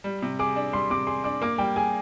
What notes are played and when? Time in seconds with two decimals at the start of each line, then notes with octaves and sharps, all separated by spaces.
0.04 G3
0.22 C3
0.39 G#4 D6
0.56 D4
0.73 G3 C6
0.90 C3 D6
1.07 G#4 C6
1.24 D4 D6
1.42 A#3 D6
1.58 G3 G5
1.76 G#4 G#5